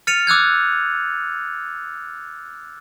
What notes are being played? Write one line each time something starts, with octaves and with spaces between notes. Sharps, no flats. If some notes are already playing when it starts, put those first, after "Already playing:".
F6 A6 C#7 D#7 F7
D6 E6 F#6 G#6